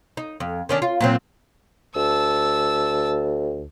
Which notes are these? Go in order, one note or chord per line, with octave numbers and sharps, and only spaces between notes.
D#4
F2
D#3 C#4 D4
F4
A#2 F#3 C4
D2 A5 E6